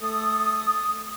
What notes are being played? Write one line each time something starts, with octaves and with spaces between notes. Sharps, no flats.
A3 A4 D#6